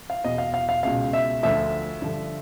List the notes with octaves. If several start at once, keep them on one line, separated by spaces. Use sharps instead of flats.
F5
E2 B2 D#5
F5
F5
F5
C#2 B2 F5
E5
D2 D3 F3 E5
G2 D3 F3